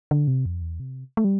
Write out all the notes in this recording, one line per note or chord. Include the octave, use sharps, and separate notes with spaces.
D3
C3
F2
E2
C3
A3
G3